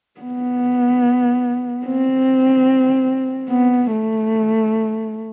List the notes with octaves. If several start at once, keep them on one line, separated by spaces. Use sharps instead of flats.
B3
C4
B3
A3